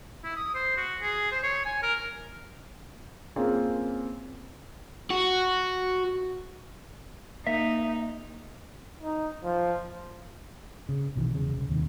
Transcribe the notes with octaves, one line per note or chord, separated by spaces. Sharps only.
E4
D#6
C5
F#4
G#4
C5
C#5
G#5
A#4
A#3 C4 C#4 F4 G#4
F#4
A#3 D#4 E5
D#4
F3
C#3
B1 B2 D#3 E3
E1 C#3
C2 C#3
D#1 D#2 C3 D#3